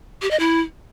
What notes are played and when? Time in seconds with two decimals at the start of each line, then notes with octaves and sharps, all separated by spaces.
0.22 G4
0.31 D#5
0.39 E4